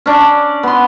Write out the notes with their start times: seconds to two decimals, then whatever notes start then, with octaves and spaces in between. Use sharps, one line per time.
0.06 C#4 D4
0.63 B3 C6